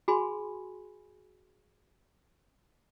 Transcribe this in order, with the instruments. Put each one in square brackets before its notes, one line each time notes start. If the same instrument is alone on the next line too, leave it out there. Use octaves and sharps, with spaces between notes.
[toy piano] F#4 G#4 G#5 B5 C6